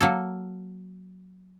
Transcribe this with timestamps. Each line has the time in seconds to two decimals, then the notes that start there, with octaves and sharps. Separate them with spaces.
0.01 F#3 A#3 A4